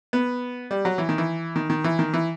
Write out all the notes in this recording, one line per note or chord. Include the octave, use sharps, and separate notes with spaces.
B3
G3
F#3
E3
D#3
E3
D#3
D#3
E3
D#3
E3